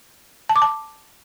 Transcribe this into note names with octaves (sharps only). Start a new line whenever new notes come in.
A5
D6
A5